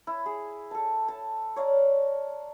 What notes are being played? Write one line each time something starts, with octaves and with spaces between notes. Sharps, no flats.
E4
G#4
A4 A5
A5
C#5 D5 F5 A#5